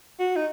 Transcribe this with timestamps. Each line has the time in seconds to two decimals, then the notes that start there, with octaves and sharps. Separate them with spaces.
0.19 F#4
0.36 D#4